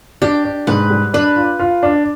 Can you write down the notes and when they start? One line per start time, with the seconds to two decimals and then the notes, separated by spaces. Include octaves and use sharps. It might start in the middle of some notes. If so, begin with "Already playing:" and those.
0.22 D4 G4
0.45 D4
0.67 G#2 B4
0.90 G3
1.14 D4 B4
1.36 F4
1.59 F4
1.83 D4